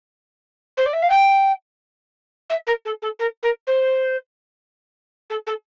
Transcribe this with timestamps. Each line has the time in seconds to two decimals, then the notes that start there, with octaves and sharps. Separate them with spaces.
0.77 C5
0.86 D5
0.93 E5
1.02 F5
1.10 G5
2.50 E5
2.67 A#4
2.85 A4
3.02 A4
3.19 A#4
3.43 A#4
3.67 C5
5.30 A4
5.46 A4